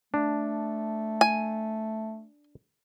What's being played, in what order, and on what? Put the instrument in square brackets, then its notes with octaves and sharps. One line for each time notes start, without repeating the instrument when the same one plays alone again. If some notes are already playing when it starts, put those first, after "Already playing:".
[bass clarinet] A3 [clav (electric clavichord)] D4
[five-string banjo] G#5